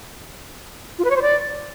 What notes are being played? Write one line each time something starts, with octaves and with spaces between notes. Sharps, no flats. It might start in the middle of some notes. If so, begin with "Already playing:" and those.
F4
B4
C#5
C5
D5